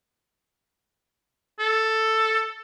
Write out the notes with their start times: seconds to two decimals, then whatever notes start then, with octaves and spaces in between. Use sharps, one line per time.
1.59 A4